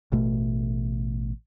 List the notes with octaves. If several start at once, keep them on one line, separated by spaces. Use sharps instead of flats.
A1 B2 A3